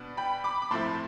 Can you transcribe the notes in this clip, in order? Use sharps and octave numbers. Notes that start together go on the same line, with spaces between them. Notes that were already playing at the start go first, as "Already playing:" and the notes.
Already playing: B2 B3 D4
G5 B5
B5 D6
D6
A2 F3 A3 C4 E4 A5 C6